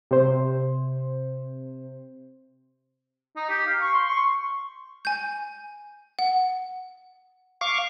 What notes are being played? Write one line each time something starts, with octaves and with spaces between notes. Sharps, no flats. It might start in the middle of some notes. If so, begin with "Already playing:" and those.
C3 C5
D#4
G4
F5
C#6
C6
C#6
G#5 G6
F#5
F5 C#6 D6